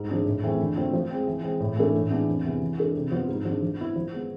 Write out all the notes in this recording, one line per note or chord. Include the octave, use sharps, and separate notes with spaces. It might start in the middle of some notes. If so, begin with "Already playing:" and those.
Already playing: G#2
F3 G#3 D4 G#4
A2
E3 A3 C4 G#4
D3
A3 C4 F4
F3
G#3 C4
E3
G#3 C4
A2
E3 A3 D4 A4
A2
E3 G#3 B3 D4
F2
C3 E3 G#3 B3
E3
G#3 D4 A4
C3
F3 B3 F4
G#2
F3 G#3 D4
F3
B3 E4
F3
G#3 B3